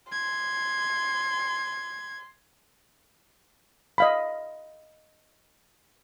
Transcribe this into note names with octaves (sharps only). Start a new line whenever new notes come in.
C6 G#6
D#5 F5 B5